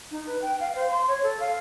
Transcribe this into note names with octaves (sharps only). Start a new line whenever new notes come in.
D#4
B4
G5
F5
C5
C6
C#5
A4
F5